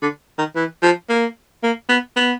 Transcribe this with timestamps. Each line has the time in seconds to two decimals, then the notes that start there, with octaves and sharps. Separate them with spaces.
0.02 D3
0.38 D#3
0.56 E3
0.83 F3
1.09 A#3
1.63 A#3
1.89 B3
2.16 B3